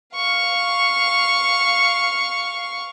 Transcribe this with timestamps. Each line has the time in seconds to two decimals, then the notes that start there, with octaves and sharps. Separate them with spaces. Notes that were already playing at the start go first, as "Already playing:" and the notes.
0.15 F5 C#6